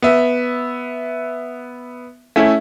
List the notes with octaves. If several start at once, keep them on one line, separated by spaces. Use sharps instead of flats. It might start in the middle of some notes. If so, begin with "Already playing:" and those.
B3 E5
A3 C#4 E4